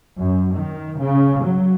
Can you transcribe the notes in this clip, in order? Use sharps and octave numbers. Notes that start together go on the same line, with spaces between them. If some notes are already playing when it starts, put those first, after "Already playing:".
F#2
D#3
C#3
F#3